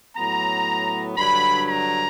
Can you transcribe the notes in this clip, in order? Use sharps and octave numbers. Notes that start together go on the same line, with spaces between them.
A2 F#3 B3 A#5
G2 D3 F#3 B5
A#5